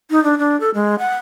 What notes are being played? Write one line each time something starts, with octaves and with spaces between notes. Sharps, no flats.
D#4
D4
D4
A4
G#3
F#5